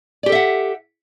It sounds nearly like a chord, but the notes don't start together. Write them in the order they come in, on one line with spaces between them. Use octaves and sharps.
D5 G4 A4 E5 F#5